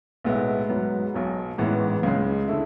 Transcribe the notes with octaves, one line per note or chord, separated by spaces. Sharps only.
B1 A2 G#3 B3 E4
G#2 F#3 B3
B1 B2 F#3
A1 G#2 E3 B3
C#2 C#3 G#3
D3 A3 E4